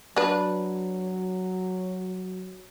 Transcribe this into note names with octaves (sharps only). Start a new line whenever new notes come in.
F#3 D4 B4